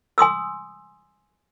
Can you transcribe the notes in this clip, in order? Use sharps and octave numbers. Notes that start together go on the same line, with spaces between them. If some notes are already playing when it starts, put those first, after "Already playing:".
G#5 C6 D#6 E6